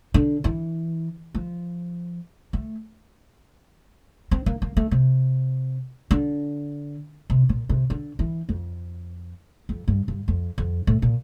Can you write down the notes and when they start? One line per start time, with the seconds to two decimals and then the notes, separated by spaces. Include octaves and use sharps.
0.14 D3
0.44 E3
1.35 F3
2.53 A3
4.31 C4
4.46 A#3
4.62 A#3
4.77 A3
4.91 C3
6.11 D3
7.30 C3
7.49 A#2
7.69 C3
7.90 D3
8.19 E3
8.49 F2
9.69 F2
9.88 G2
10.08 G2
10.28 F2
10.58 F2
10.87 A2
11.02 A#2